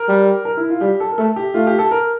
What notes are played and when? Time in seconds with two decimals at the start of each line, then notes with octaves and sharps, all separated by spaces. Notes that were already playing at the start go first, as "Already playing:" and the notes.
Already playing: A#4
0.09 G3
0.45 A#4
0.57 E4
0.70 F4
0.81 G3 G4
1.00 A4
1.11 A#4
1.18 A3 A4
1.36 G4
1.54 A3 F4
1.67 G4
1.78 A4
1.91 A#4